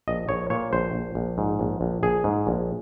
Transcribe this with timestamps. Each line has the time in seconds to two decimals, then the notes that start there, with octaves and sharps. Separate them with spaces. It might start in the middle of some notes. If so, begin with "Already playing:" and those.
0.08 A#1 D#5
0.29 A#1 C#5
0.50 A#2 C#5
0.73 A#1 C5
0.94 A#1
1.15 A#1
1.38 G#2
1.59 A#1
1.81 A#1
2.03 A#1 G#4
2.24 G#2
2.47 A#1